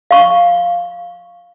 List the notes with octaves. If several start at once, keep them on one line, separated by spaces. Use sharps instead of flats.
F5 C#6